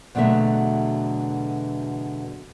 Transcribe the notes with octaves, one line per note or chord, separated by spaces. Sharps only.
E2 B2 D3 F#3 A3 E5